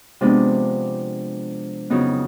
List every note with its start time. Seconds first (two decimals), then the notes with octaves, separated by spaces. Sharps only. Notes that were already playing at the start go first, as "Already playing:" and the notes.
0.21 C3 F3 G#3 B3 D4
1.90 F2 C#3 F#3 B3 D#4